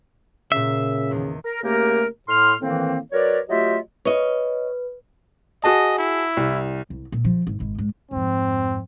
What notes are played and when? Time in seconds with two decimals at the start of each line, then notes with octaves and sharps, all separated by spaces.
0.52 A#2 C#3 E5 C7
1.11 E2 D#3
1.45 A#4
1.63 C#3 A3 A#3 G4 A#4
2.29 A2 C6 F6
2.61 A2 D#3 E3 A#3 C4
3.12 F#3 A#4 B4 C#5 D5
3.49 F#3 A3 F4 G4 D#5 E5
4.05 B4 C#5 D#5
5.64 F#4 G#4 D#5 A5
5.98 E4
6.37 C2
6.90 C2
7.12 A#2
7.25 F3
7.47 G#1
7.60 G#1
7.78 G#2
8.11 F2 G#2 C4